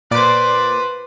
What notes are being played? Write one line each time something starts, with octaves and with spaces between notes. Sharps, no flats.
A#2 B4 C5 D5 D6